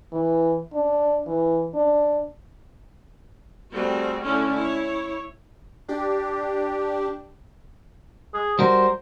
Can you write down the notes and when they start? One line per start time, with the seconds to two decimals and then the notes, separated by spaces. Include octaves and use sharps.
0.12 E3
0.73 D4
1.27 E3
1.74 D4
3.74 G3 A3 C4 F#4 G#4
4.23 D3 A3 C#4 E4
4.53 E4 C#5
5.88 D4 G4
8.34 G#4
8.59 G3 F#4 A#4 C5